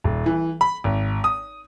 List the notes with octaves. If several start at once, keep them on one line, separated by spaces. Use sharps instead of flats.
D#1
E3
B5
G#1
D#6